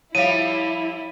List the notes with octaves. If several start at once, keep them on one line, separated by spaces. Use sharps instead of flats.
F3 G3 E4 C#5 F5 D#7